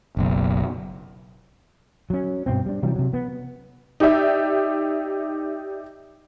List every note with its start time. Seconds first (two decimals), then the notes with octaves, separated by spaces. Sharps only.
0.17 F#1 B1
2.10 F#3 C#4
2.46 G2 B2 C4
2.66 G3 D4
2.83 C3 E3 F#3 G3
2.96 C3 F#3
3.13 B3
4.00 D#4 G4 D5 E5